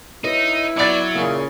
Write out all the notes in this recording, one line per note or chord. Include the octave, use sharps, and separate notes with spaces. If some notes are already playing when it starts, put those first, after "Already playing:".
D#4 E4 B4 C#5
F#3 B3 D5 B5 A6
A#2 C#3 A#3